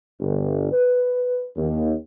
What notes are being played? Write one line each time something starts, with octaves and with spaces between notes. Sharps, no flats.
G1
B4
D#2